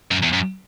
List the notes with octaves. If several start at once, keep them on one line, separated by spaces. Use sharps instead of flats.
F#2
E2
F#2